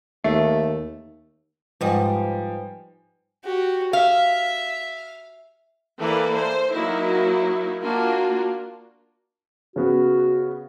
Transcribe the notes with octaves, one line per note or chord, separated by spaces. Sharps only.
D#2 A3
G#2 F3 G3 B4 D#5 G5 G#5
F#4 G4
E5 F5
E3 A#3 A4 B4 D5
C5
F#3 A#3 D#4 E4
A#3 D4 F4 F#4
C#3 B3 F#4